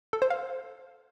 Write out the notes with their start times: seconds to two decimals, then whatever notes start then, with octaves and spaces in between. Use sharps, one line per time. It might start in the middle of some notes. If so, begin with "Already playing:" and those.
0.13 A4
0.22 C5
0.30 F5